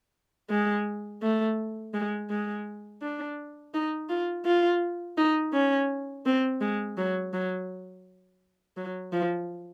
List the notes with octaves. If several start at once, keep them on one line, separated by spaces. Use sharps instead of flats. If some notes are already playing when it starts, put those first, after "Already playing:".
G#3
A3
G#3
G#3
D4
D#4
F4
F4
D#4
C#4
C4
G#3
F#3
F#3
F#3
F3